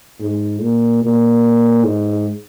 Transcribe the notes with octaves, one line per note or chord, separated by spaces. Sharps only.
G#2
A#2
A#2
G#2